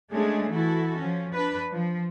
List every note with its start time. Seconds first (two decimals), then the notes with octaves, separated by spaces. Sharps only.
0.11 G#3 A3 C#4 D4 G#4
0.52 E3 E4 F#4 A4
0.98 F3 C#4
1.33 D4 B4
1.72 F3